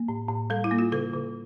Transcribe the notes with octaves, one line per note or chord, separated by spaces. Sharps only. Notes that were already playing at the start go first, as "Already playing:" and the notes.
Already playing: A#3
A2
A2
G3 A4
E4
A#3
F4
C#3 A4
C#3